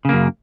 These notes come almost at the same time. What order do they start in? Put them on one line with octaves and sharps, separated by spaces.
C#3 A#3 F#2